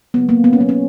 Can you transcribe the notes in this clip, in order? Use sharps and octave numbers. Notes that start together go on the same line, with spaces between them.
C#3 F#3 A#3 B3
A#3
B3
C#4
B2 F#3 A#3 B3
C#4